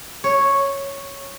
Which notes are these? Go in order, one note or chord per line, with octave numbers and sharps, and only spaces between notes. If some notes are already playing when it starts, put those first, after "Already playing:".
C#5